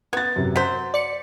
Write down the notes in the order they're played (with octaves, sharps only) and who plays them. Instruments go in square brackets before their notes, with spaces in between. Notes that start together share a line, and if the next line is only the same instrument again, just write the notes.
[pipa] B3 [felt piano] G#6 A6
[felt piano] F#2 C3
[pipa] F#3 C5 [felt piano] B6
[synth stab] D5 C#7